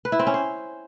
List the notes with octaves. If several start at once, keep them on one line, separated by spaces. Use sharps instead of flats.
B4
E4
C4
C#4
C5